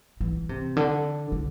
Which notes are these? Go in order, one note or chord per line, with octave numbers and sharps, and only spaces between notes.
E3
C3
D3
D3